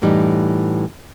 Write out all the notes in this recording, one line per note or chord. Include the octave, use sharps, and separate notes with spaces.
F#2 A2 E3 G3 D#4